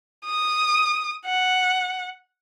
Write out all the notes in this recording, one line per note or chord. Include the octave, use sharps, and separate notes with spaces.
D#6
F#5